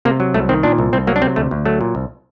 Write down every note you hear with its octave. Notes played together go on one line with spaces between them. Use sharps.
C3 A#3
F#3
C2 A3
D#3 C4
A#2 D4
C2
C2 C4
F#3 A#3
D4
C3 C4
D2 A3
D2
F#3 A3
A#2
C2